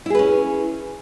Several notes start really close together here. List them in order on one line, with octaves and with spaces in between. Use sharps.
E4 G#4 B4 C#4